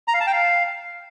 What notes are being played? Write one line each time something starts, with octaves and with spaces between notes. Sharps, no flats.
A#5
F5
A5
G5
F5